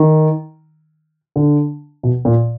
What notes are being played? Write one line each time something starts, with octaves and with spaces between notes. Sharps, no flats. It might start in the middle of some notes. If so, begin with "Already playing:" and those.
Already playing: D#3
D3
B2
A#2